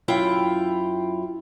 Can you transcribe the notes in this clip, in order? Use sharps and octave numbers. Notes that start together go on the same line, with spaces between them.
F#2 E4 F4 G5